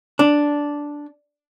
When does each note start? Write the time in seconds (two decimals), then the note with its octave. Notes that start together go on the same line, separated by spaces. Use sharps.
0.19 D4